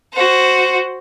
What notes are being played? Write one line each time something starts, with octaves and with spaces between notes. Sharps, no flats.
F#4 C5